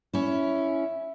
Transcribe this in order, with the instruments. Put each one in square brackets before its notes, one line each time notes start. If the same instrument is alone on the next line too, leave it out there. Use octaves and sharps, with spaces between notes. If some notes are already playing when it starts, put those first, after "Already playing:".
[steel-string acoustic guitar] C#4 E4